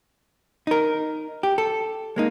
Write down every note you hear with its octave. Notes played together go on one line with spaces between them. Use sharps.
D#4 A#4
G4
A4
G#3 A#3 D#4